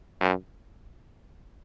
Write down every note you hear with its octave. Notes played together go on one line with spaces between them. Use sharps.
F#2